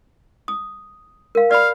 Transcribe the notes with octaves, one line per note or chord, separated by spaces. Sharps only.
D#6
A#4 F5
D5 F5 B5